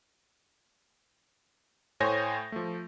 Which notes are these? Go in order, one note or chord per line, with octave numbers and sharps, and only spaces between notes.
A2 C5 C#5 G#5 G6 A#6
F3 A3